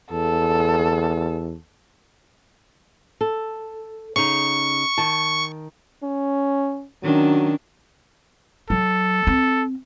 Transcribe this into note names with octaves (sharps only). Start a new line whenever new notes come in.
E2 A4
A4
C#3 D#4 C#6
D#3 A5
C#4
D#3 F#3 C#4 D4
F#3 A4
C4